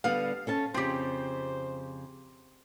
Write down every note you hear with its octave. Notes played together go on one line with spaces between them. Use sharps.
D3 G3 B3 F5
C#4 A4 A5
F2 C#3 C4 G4 C5